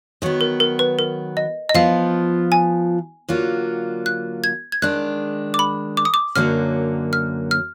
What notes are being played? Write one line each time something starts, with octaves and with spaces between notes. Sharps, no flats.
D#3 F#3 B3
A#4
A#4
B4
A#4
D#5
D#5
F3 B3 F4 F5
G#5
D3 F#3 A#3 F4
F#6
G#6
G#6
D#3 G#3 D4 F#6
D6
B5
D6
D#6
D6
F#2 D3 F#3 A#3 F6
F6
F6